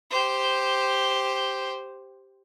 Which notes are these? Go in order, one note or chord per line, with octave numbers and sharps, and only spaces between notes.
G4 C5